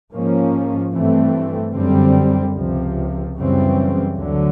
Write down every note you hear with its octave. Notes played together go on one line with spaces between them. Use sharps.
G#2 F3 A#3 C#4
G2 E3 A3 C4
F#2 D3 G3 C4
C#2 C3 F3
F#2 C#3 E3 G3 C4
D2 D3 F#3